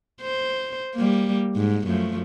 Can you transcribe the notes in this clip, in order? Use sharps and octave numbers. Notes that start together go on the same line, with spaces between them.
C5
G3 A#3
G#2
F#2 F3 A3